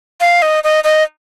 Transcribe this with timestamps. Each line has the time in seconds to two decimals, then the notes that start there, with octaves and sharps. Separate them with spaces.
0.21 F5
0.42 D#5
0.64 D#5
0.84 D#5